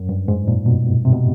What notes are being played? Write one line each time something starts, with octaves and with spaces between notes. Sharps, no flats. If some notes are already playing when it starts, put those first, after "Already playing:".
Already playing: F#2
G2
G#2
A#2
B2
C3
B2